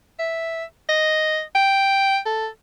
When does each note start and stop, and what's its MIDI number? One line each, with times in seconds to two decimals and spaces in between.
0.19 0.64 76
0.89 1.41 75
1.55 2.18 79
2.26 2.47 69